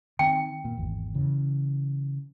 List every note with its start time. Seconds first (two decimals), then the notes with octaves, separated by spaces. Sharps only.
0.19 D#3 C4 G5
0.64 A#2
0.77 G#1 E2
1.15 C#3 E3